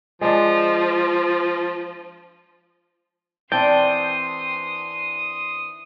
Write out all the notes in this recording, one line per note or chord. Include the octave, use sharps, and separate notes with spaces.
F3 G#3 D4
E3 C4 D4 G5 A5 C6 D#6